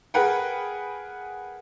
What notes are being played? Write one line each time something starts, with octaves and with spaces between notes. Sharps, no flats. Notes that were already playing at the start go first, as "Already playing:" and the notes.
G#4 A#4 B4 F#5 G5